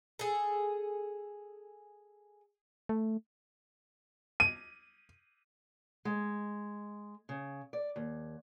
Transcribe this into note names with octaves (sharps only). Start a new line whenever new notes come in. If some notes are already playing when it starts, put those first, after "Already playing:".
G#4 A4
A3
D#7
G#3
C#3
D5
D#2